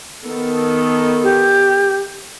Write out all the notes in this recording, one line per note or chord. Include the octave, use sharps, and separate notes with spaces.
D#3 B3 A4
G4